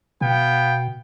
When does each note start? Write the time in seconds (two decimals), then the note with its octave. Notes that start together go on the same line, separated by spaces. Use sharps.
0.21 B2 B3 F5 G5